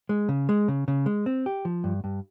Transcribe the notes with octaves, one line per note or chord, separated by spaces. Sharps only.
G#3
C#3
G#3
C#3
C#3
G#3
C4
G4
F3
G2
G2